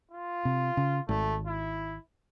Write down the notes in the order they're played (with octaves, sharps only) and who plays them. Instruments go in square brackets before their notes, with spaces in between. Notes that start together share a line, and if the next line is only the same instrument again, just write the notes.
[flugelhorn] F4
[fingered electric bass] C3
C#3
[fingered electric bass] G#1 [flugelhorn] A3
[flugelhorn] E4